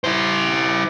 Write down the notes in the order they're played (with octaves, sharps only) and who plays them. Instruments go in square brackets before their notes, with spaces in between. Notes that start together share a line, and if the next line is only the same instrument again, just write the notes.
[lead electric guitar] E4 C5